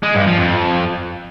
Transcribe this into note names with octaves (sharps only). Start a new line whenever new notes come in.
G#3
G2
F3
F2